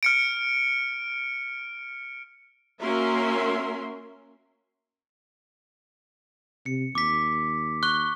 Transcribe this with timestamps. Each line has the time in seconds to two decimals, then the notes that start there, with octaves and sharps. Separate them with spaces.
0.03 F6 C#7 D7
2.81 A#3 C#4 F#4 A#4 E5 C6
6.66 C3 C#7
6.95 D#2 D6 B6
7.83 C#6 F#6 G7